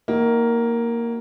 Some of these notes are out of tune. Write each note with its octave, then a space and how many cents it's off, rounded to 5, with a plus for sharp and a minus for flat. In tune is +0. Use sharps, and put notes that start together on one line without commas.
A#3 +0 D#4 +30 F#4 +30